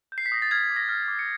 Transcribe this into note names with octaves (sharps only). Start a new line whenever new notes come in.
G6
C7
B6
D#6 A#6
A6
F6 G#6
D6
A#6
F6
B6
D6
C#7